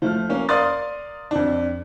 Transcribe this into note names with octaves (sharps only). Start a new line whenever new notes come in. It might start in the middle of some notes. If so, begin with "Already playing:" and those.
F3 A3 F6
A#3 C#4
A#4 D5 F5 C6 D#6 A6
F2 D4